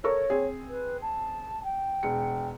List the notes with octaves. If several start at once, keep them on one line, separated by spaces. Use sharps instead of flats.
A4 A#4 C#5 C#6
C4 G#4
B4
A5
G5
E1 C#7